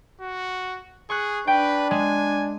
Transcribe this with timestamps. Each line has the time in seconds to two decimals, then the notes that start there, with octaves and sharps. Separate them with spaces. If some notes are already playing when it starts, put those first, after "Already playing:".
0.21 F#4
1.10 G#4 C#6 F#6
1.47 D4 B4 G5
1.91 G#3 G#5